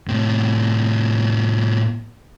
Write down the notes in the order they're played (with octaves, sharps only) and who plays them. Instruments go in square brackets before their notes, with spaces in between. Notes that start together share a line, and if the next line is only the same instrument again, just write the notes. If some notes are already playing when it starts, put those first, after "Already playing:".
[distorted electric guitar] A2 C3